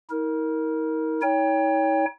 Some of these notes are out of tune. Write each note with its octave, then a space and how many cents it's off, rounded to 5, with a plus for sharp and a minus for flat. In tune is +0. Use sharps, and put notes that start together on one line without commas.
D#4 +45 A#4 +0
D#4 +40 C#5 +20 G5 +25